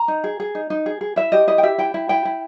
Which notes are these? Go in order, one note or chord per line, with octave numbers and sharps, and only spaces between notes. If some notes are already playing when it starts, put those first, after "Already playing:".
Already playing: A#5
D#4
G#4
G#4
D#4
D#4
G#4
G#4
E4 E5
G4 D#5
E4 D#5
G5
G4 E5
E4 G5
E4
E4 G5
E4